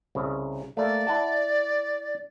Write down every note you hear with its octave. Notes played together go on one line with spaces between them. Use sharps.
C2 C#3
A3 A#3 D5
E4 F#5 A5